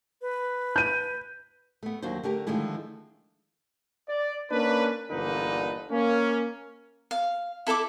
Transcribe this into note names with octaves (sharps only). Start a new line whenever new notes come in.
B4
G6 D#7
A3 B3
D#2 D3 F#3 A#3 D4 C5
D3 A3 G4 A#4
D3 D#3 F3 G#3 A3 E4
D5
A#3 C#4 D4 B4
G1 A#2 D3 E3 D#4 B4
A#3 C#4
F5
E4 A4 E5 D6